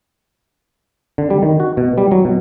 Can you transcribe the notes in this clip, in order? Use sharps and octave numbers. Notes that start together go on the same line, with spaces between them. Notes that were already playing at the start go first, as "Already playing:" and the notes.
D3
G3
D#3
F#4
B2
G3
F#3
B2